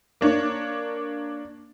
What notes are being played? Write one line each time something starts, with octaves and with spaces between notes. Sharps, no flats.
A#3 D4 C#5